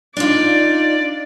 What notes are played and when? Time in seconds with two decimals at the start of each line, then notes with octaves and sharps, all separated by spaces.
0.17 D4 D#4 F4 D5